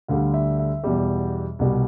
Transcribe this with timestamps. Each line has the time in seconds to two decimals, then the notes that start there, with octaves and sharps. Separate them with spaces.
0.08 D2 D3 G3 F5
0.34 E5
0.59 E5
0.84 E2 B2 G3
1.59 C2 B2 G3